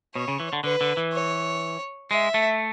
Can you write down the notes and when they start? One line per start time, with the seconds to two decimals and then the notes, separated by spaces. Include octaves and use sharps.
0.15 B2 C#5
0.28 C#3
0.40 E3
0.53 D3
0.64 D3 B4
0.81 D3
0.97 E3
1.13 C#5
2.10 G#3 E5
2.34 A3